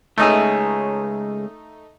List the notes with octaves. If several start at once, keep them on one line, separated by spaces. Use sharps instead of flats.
C#2 A3 D#4 G#4